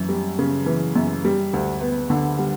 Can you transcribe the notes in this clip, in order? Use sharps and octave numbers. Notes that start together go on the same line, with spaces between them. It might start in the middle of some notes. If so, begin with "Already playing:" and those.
Already playing: F#2 E3
G3
C#3
E3
F#2
G3
D2
B3
D3
G3